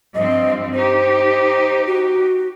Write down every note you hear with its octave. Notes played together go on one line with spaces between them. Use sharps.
G2 F3 C4 D#5
D#4 G4 C5
F#4